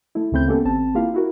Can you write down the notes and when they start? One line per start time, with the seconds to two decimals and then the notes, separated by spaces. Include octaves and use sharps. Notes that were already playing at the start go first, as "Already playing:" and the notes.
0.15 A3 E4
0.32 D2 C#3 A3 C4 B5 G6
0.47 G#3 A#3 B3 C#4 G4 A4
0.65 G#1 C4 A5
0.95 A#3 E4 F4 G4 F5
1.14 E4 F#4 A#4